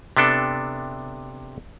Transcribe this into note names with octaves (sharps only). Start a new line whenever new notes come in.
C3 B3 D4 A4